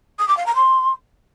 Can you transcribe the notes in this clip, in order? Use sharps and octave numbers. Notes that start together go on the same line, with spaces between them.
D#6
D6
F5
A#5
C6